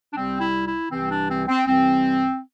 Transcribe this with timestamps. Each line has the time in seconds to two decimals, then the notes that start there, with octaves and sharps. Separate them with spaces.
0.11 D4
0.15 C2 C3 G3 C4
0.40 E4
0.66 E4
0.91 C2 C3 E3 C4
1.11 D4
1.30 C4
1.48 C4
1.67 C2 C3 E3 G3 C4